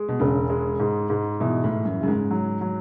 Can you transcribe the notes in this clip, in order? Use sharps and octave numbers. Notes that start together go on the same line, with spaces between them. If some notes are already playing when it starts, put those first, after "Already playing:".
Already playing: G#3
B2
E1 C#3
G#3
G#2
G#2
B2 E3
A2
E3
F#2
F#2 C#3
G#2
F#3
F#3